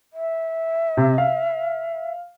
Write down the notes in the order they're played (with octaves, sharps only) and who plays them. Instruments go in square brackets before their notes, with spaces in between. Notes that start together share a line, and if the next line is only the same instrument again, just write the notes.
[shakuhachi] E5
[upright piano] C3
F5